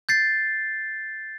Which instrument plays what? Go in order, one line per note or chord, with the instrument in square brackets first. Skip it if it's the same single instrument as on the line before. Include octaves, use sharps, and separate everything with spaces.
[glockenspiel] G6 A6 C7